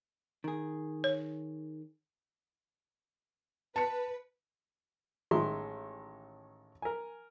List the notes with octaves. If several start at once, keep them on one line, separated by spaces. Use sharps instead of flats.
D#3 G#4
C#5
B4 A5 C#7
A1 D#3 G#3 E5 C6
A#4 G#5